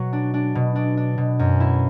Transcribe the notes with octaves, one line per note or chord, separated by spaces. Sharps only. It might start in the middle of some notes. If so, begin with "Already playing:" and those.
Already playing: B2 F#3 F#4
D4
D4
B2
D4
D4
B2
F#2
E4